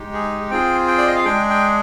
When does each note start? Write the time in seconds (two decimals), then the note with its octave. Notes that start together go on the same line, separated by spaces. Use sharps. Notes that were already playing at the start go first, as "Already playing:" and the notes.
Already playing: G#3 D#4 G4
0.14 G#4
0.50 C4 F4 G#4 G5
0.88 G5
0.98 D5
1.07 D#5
1.16 F5
1.25 G#3 D4 G#4 G5
1.50 G5